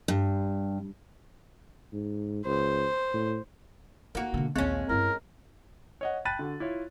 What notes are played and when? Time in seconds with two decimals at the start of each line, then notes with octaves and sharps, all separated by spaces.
0.08 G2
1.93 G#2
2.45 C#2 C5
3.13 A2
4.15 A#3 D#4 F#4
4.34 B2 D3
4.56 A#1 D#2 G#3 C4 C#4
4.89 G2 E4 A#4
6.01 C#5 D#5 F#5
6.25 G5 A5 B5 F#6 A6 D#7
6.39 D3 F#4
6.60 E4 F4 C#5